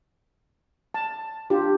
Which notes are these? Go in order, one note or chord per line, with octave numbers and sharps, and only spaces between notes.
A5
D4 F4 G4